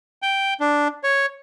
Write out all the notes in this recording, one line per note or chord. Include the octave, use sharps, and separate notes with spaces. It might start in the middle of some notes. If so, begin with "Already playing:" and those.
G5
D4
C#5